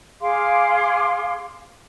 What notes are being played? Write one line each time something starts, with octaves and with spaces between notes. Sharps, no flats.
G#4 F5 C6 D6